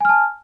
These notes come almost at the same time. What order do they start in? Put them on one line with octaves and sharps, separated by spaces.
G#5 F6 A5